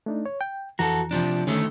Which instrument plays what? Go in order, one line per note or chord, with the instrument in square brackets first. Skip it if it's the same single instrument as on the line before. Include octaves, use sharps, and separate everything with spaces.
[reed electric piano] A3 D4 D#4
C#5
G5
[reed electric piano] F2 E3 A#5 [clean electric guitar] F#4 A4
[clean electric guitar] C3 F3 D4
[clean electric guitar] D3 D#3 A3 [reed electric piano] C#4